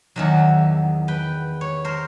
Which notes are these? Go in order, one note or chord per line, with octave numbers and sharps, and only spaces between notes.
E2 D#3 F#3
B4 G5
C#5
A#4 C5